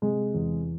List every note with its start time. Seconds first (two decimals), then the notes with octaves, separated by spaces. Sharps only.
0.02 C3 G#3
0.34 E2